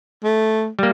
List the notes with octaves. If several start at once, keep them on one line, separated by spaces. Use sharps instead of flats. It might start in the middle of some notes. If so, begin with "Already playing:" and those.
A3
G3 A#3